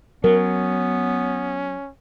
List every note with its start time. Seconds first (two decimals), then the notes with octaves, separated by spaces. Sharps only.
0.24 F#3 B3 C#4 A#4